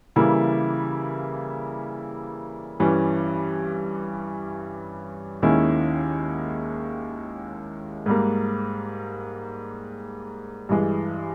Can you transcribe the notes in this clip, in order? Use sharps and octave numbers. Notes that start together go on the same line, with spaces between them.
C#3 E3 G3 A#3 E4
G2 E3 G3 C#4
D#2 D#3 G#3 C#4 E4
G#2 G3 A#3
G2 E3 G#3